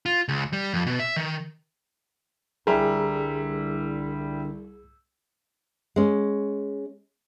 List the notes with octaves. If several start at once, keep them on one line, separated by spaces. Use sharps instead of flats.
F4
C#2
G3
F2
B2
E5
D#3
C2 D3 G3 E4 G4 G#4 A#4
G#3 C#4